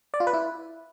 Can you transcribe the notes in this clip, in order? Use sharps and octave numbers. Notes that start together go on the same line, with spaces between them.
D5
F4
B4
E4